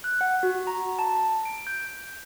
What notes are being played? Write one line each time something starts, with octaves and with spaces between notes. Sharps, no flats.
F#6
F#5
F#4
A#5
A5
D7
G6